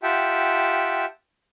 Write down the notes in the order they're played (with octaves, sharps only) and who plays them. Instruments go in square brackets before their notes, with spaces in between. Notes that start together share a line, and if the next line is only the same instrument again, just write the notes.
[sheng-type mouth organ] F4 G4 E5 F#5 G5 A5